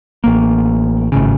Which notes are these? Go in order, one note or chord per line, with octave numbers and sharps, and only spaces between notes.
A1 A#3
G#1 A2 C#3